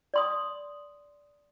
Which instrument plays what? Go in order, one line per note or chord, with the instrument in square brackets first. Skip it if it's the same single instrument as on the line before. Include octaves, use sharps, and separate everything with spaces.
[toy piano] D5 C6 D#6